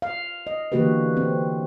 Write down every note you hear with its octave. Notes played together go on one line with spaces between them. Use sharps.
F5
D#5
D3 E3 A#3 F#4 G4 B4
C4